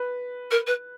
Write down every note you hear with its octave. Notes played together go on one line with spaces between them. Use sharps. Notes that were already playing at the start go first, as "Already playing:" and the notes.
Already playing: B4
A#4
B4